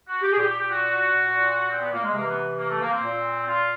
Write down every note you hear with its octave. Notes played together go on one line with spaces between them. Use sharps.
F#4
G4
G#4
A#2 G4
G4
G4
F#4
A#2
C4
B3
A#3
G#3
C3 E3 A#3
B3
A#3
A3
A#3
C4
A#2
F4